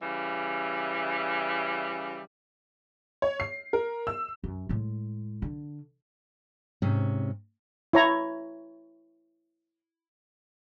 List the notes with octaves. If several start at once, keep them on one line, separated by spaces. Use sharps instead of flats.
C#3 E3 G3
C#5
C7
A#4
E6
F#2
A2 G#3
D3
G#2 C3 C#4
E4 C#5 A#5